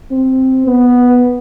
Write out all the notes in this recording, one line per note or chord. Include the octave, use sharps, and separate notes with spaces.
C4
B3